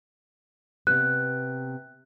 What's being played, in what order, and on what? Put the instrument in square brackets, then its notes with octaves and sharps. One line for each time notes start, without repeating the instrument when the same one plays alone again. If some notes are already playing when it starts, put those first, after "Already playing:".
[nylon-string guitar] C3 B3 [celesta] F#6